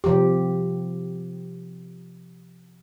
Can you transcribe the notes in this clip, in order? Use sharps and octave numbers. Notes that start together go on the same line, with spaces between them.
C3 F3 G4